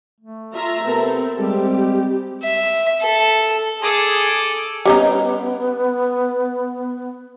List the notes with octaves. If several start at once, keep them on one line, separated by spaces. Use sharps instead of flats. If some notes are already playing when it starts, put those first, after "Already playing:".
A3
F4 E5 A#5
C3 B3 C4 A4 A#4
G3 G#3 C4 G4
E5
A4
G#4 A4 D6
G3 B3 C#4 D#4